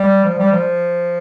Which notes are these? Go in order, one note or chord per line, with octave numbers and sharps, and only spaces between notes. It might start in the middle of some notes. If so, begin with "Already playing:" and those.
Already playing: G3
F3
G3
F3